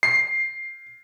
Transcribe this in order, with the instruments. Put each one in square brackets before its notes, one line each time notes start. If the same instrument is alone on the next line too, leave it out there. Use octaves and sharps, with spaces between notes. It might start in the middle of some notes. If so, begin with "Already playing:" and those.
[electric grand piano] C7